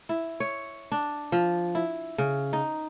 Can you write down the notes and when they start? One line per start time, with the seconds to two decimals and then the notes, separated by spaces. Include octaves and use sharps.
0.09 E4
0.40 C#5
0.92 D4
1.32 F3
1.75 E4
2.18 C#3
2.53 D#4